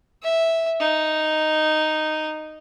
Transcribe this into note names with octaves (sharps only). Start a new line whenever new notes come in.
E5
D#4